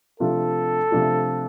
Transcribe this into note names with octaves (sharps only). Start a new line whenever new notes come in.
C3 F3 A3 D4 F4 A4
C3 F3 A3 D4 F4